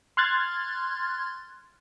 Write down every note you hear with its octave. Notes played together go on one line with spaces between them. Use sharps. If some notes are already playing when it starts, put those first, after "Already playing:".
C6 F6 F#6 G#6 A6